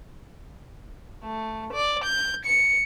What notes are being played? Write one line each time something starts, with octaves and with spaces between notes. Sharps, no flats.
A3
D5
G6
C#7